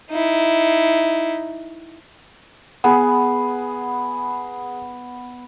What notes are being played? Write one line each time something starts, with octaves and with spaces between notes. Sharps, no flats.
D#4 E4
B3 G#4 G#5